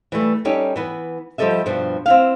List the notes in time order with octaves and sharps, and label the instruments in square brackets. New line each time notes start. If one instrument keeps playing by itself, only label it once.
[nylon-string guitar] E3 G3 A3
G3 C#4 D#4 G4 A4
E3 B3 B4
F3 G3 G4 A4 D#5 E5
G2 B2 F3 G3 D4
C4 E4 F5